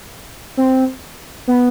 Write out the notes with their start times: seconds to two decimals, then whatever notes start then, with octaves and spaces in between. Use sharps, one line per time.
0.57 C4
1.47 B3